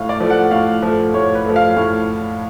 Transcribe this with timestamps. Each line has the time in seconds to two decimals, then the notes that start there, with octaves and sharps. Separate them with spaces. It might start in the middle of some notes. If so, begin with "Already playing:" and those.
Already playing: A2 F5
0.09 D5
0.20 F3 A3
0.30 F#5
0.51 A2 F5
0.82 F3 A3
1.14 A2 C#5
1.35 B4
1.46 F3 A3
1.56 F5
1.76 A2